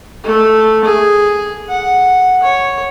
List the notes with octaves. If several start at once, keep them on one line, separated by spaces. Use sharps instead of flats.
A3
G#4
F#5
C#5